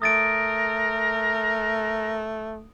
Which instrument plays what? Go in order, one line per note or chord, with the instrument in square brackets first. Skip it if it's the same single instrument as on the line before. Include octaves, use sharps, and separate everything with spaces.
[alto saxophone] A3 [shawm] A#4 [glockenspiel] D#6 A6 D7